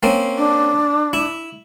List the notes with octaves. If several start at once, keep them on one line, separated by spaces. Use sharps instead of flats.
A#3 C4 C#4
D4
E4